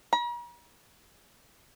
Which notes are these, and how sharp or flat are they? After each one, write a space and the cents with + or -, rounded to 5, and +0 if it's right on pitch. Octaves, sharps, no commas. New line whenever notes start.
A#5 +45